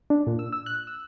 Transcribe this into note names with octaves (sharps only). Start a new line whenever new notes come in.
D4
A#2
E6
E6
F#6
E6